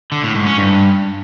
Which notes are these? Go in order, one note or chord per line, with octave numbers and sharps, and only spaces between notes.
D3
A2
G#2
C#4
G2